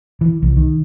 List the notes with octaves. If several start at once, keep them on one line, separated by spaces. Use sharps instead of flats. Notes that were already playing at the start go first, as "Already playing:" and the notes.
E3
C2
D#3